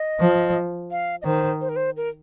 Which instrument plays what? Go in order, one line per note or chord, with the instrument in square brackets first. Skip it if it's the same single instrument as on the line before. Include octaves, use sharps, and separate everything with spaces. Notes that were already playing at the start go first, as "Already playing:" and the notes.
Already playing: [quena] D#5
[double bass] F3
[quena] F5
D#5
[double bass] D#3 [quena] C5
[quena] C5
A#4
C5
A#4